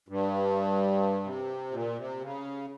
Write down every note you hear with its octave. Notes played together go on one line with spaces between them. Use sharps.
G2
C3
A#2
C3
C#3